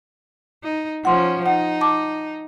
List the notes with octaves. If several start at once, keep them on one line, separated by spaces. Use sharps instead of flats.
D#4
F3 C#4 F#5 C6
D#4 F#5
A5 D6